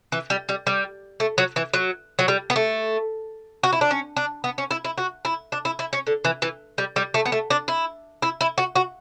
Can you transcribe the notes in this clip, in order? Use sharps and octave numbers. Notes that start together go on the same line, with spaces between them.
E3
G3
G3
G3
A3
F#3
E3
F#3
F#3
G3
B3
A3
F#4
E4
D4
C#4
D4
B3
C#4
E4
E4
F#4
E4
D4
E4
E4
C#4
D3
E3
E3
G3
G3
A3
B3
A3
D4
E4
E4
E4
F#4
F#4